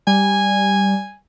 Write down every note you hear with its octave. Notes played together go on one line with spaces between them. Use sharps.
G3 G#5